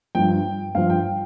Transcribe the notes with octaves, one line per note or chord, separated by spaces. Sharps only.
G2 F3 G5
G2 F3 F5
G5